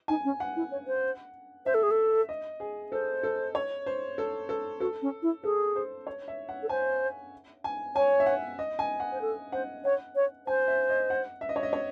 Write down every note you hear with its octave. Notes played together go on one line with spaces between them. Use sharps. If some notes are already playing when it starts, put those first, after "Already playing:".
D#4 G#5
C#4
F#5
E4
C#5
C5
C5 E5
A4
G#4
A4
D#5
G#4
A4 C5
A4
C#5
C5
A4
A4
F#4 A4
C#4
E4
G#4 A4
C5
C#5
E5
F#5
A4
C5 G#5
G#5
C#5 G#5
E5
F#5
D#5
G#5
F#5
C5
A4
C5 F#5
C#5 F#5
C#5
C5 G#5
E5
D#5
F#5
E5
D#5
C#5
D#5
C#5